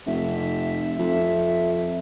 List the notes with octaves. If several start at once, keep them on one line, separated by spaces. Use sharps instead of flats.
F1 E5
F2